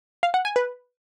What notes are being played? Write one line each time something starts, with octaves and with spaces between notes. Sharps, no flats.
F5
F#5
G#5
B4